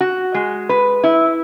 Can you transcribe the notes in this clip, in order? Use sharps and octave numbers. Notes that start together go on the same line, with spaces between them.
F#4
G#3
B4
E4